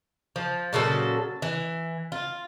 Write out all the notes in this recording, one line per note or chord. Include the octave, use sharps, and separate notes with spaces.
F3
A#2 C#3 F#3 A4
E3
F4